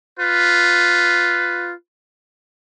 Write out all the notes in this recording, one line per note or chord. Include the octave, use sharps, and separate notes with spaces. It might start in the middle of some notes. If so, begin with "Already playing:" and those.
F4 B4